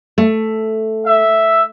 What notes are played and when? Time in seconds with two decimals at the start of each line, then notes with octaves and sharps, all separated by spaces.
0.18 A3
1.05 E5